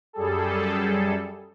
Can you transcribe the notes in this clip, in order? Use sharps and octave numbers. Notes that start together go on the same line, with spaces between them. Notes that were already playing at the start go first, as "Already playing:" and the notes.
F#2 G3 G#4 A4